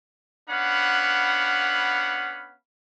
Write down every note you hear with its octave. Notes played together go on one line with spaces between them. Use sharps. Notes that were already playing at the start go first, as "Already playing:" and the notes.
B3 C#4 D4 F5 F#5 B5